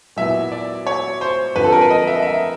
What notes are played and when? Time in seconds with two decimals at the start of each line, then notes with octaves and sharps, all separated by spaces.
0.17 A#2 F#3 B3 E4 E5
0.52 D5
0.87 C#5
1.21 C5
1.56 F2 D3 F3 B4
1.64 A4
1.72 A#4
1.81 B4
1.90 D#5
2.07 E5
2.15 D#5
2.22 E5